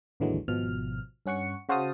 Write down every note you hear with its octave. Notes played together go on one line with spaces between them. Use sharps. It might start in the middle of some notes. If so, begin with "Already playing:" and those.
A1 D#2 D3 E3 F#3 G#3
G#1 B2 F3 F6
G2 C#4 F#5 C#6 C#7
C#3 F#4 C5 F5 A5 D#6